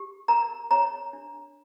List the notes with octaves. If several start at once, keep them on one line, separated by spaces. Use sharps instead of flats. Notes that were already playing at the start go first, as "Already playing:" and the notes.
Already playing: G4
A#4 A#5
C#5 A#5
D4